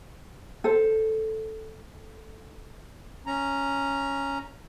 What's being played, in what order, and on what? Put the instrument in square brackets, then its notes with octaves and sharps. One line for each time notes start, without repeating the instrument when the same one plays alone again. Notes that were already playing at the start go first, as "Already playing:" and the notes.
[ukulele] A4 C5
[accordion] C#4 A#5